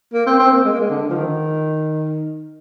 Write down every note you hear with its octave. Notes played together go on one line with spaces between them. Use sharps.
A#3
C4
C4
A#3
G#3
A#3
G#3
D3
F3
D#3